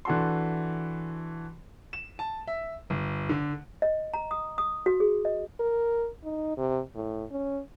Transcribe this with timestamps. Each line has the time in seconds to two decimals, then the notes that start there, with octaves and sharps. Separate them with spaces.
0.05 E3 D4 F#4 A4 C6
1.93 E7
2.19 A5
2.47 E5
2.90 G1
3.29 D3
3.82 D#5
4.13 A#5
4.31 D#6
4.58 D#6
4.86 F#4
5.00 G#4
5.25 D#5
5.60 A#4
6.24 D#4
6.57 C3
6.95 A2
7.31 C#4